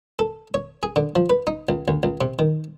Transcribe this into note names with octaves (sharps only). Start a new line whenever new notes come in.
A4
C#5
G#4
D3
F3
B4
D#4
C#2
D2
C#2
C3
D#3